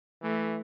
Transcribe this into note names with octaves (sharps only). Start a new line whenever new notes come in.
E3 A3